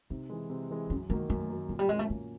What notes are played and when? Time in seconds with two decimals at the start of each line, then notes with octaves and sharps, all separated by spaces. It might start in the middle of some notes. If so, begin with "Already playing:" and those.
0.10 C3 D#4
0.30 E3 G#3
0.50 C3
0.70 E3 G#3
0.90 F#2 C#4
1.10 D#3 F#3 A3 A#3
1.30 F#2 A3
1.50 D#3 F#3 A#3
1.69 A#2 F#3
1.79 G3
1.89 F#3 G#3 A#3 C#4
1.99 A3
2.09 A#2 A#3